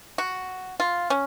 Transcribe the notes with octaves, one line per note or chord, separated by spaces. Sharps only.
F#4
F4
C#4